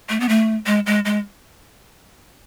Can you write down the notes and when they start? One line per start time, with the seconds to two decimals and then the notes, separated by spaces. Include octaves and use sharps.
0.09 A3
0.20 B3
0.29 A3
0.66 G#3
0.86 G#3
1.05 G#3